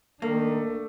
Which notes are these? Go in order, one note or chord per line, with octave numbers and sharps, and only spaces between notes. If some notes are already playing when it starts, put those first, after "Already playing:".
D#3 A3 A#3 D4